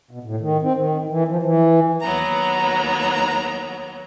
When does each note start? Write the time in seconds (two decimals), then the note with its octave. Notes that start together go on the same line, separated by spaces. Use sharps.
0.11 B2
0.24 A2
0.40 D#3
0.62 C4
0.76 D#3
1.10 E3
1.28 F3
1.43 E3
2.01 D#2 F#3 B3 A#5